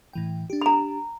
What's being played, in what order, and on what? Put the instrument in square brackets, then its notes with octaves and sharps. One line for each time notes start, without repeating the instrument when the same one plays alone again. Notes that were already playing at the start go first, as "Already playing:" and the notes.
[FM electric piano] A2 E3 G5
D4 G4
[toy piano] A#5 B5